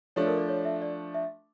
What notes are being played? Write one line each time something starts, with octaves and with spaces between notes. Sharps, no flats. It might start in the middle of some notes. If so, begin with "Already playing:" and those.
F3 A3 D4 C#5
A#4
D5
C#5
E5
D5
E5